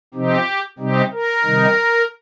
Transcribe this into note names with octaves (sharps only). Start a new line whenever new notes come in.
C3 F3 C4 D#4 G4
C3 G3 C4 D#4 G4
A#4
C3 D#3 G3 D#4